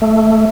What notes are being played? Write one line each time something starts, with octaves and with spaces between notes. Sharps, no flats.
A3